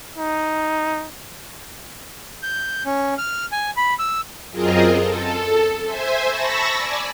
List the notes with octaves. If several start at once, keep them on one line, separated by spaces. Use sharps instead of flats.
D#4
G6
C#4
F6
G#5
B5
E6
F#2 C4 F4 G#4 A#4 D#5
A4
C5 E5 G#5
A5 B5 C#6 E6 A#6
D5 G#5